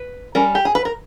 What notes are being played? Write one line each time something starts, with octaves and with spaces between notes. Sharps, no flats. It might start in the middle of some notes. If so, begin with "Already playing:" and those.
Already playing: B4
G3 C#4 A#4
G4
G#4
B4
A#4